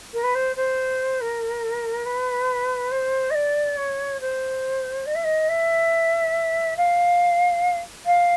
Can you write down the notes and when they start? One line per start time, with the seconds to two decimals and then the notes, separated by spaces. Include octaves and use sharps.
0.13 A#4
0.23 B4
0.34 C5
0.56 C5
1.21 A#4
2.05 B4
2.91 C5
3.30 D#5
3.34 D5
3.77 C#5
4.20 C5
5.06 D#5
5.15 E5
5.24 D#5
5.49 E5
6.76 F5
8.06 F5